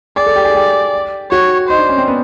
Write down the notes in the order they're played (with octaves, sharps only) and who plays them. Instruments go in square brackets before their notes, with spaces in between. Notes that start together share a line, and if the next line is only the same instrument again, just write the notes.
[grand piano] G#4 [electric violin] D5
[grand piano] A4
G4
G#4
G4
[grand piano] F#4 [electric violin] C#5
[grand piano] D#4 [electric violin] C5
[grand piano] D4
C#4
C4
B3